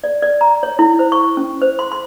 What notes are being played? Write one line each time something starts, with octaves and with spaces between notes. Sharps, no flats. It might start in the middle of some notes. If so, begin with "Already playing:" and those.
D5
D5
A#5
C#5
E4
C5
C#6
C#4
C5
C6
C6